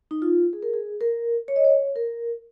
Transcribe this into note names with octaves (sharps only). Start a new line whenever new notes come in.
D#4
F4
G#4
A#4
G#4
A#4
C#5
D#5
C#5
A#4